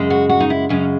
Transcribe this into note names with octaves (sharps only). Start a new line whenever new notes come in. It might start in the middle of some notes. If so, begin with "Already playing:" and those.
Already playing: F#2 C#3 G#3
F#4
F#4
D#4
E4
F#2 C#3 G#3 C#4